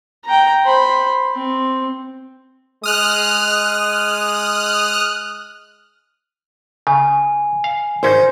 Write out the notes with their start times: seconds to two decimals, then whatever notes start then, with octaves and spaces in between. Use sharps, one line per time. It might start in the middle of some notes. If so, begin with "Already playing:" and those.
0.25 G5 A#5
0.65 C5 B5
1.33 C4
2.83 G#3 D#6 F6 F#6
6.87 C#3 G#5
7.64 F5
8.03 G#1 C#4 D#4 C5